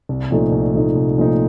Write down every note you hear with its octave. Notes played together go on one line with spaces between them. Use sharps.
C2
A#2 F3 A3 D#4
C2
A#2 F3 A3 D#4
C2
A#2 F3 A3 D#4